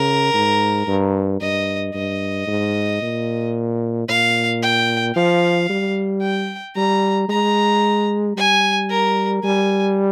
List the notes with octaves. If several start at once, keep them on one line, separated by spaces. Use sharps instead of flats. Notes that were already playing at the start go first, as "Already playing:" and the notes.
Already playing: C#3 A#4
G#2
G2
G2 D#5
G2 D#5
G#2
A#2
A#2 F5
G5
F3 F5
G3
G5
G3 A#5
G#3 A#5
G3 G#5
A#4
G3 G#5